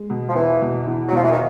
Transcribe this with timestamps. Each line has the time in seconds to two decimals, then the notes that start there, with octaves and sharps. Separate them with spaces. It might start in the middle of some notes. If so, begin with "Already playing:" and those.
Already playing: G#3
0.10 B2
0.29 F3
0.35 E2 E3
0.61 B2
0.87 E2
1.08 F#3
1.12 B2 F3
1.24 E3
1.31 D#3